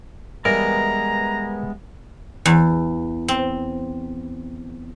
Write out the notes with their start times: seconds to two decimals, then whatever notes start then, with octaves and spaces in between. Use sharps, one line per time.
0.45 E3 G3 G#3 B3 A#4 A#5
2.46 E2
3.28 C4